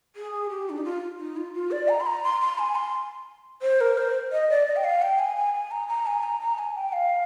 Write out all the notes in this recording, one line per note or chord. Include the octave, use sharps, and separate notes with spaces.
G#4
G4
D4
D#4
F4
D#4
F4
F4
D5
A#5
C6
A#5
C6
C6
G#5
C6
C5
A#4
C5
D#5
D5
D#5
G5
F5
G5
G#5
G#5
G#5
A#5
A#5
G#5
A#5
A#5
G#5
G5
F5